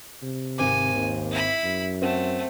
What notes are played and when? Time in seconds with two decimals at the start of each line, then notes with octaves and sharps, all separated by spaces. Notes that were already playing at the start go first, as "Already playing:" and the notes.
0.22 C3
0.58 G#1 C4 G#5 D6
0.95 D#2
1.31 E4 B5
1.64 F#2
2.02 A3 C4 F#5